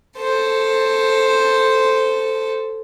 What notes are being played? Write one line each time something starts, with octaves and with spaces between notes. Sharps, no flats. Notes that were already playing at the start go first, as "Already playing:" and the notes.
A4 C5